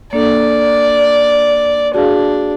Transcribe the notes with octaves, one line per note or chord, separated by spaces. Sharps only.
A#3 D4 A4 D5
D4 F#4 G#4 F5